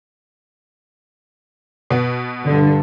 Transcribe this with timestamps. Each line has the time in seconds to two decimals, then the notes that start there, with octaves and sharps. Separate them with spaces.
1.91 B2 B3
2.45 G2 D3